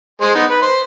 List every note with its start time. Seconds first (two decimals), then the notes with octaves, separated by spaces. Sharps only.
0.21 G#3 C5
0.35 B3 D#4
0.50 B4
0.62 C5